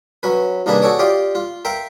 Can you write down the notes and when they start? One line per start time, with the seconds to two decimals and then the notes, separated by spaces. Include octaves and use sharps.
0.23 F#3 C#4 B4
0.66 C2 D#3 A#3 D4 G#4 B4
0.82 F#4 G#4 A4 C#5 D5
0.99 F4 G4 D5 D#5 F5
1.35 F4
1.65 A#4 E5 F5 G5